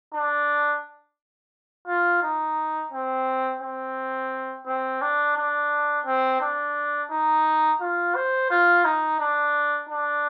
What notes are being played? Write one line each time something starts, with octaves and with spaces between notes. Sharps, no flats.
D4
F4
D#4
C4
C4
C4
D4
D4
C4
D4
D#4
F4
C5
F4
D#4
D4
D4